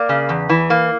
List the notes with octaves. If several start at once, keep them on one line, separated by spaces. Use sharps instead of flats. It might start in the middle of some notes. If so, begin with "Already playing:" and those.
Already playing: A#3 D5
C#3
E2
E3
A#3